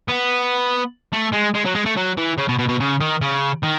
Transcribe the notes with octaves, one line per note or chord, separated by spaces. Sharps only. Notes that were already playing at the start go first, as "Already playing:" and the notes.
B3
A3
G#3
G#3
F#3
G#3
A3
F#3
E3
C#3
B2
B2
B2
C#3
D#3
C#3
D#3